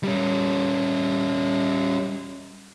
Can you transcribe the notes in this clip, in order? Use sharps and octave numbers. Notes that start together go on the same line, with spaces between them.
G3 C#4